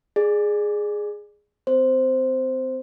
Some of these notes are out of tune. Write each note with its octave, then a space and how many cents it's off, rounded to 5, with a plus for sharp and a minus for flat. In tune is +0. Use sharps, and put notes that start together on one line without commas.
G#4 +0 D5 +25
C4 -30 C5 +0